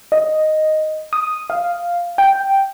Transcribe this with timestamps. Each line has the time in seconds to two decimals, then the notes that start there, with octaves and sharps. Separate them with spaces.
0.12 D#5
1.13 D#6
1.50 F5
2.18 G5